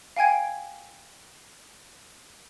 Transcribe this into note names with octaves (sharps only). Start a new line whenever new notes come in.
F5 G5 G#5 G#6 D7